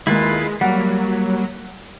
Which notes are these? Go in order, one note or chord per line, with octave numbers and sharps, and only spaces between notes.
D#2 G#3 A#3 E4 F4 B4
F#3 G3 A#3 F#5